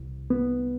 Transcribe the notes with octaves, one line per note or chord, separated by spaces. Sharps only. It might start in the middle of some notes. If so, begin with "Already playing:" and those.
Already playing: C2
B3